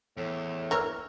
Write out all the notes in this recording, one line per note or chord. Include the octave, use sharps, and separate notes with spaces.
E2 A2
E3 A#4 C#5 A#5 E6 F6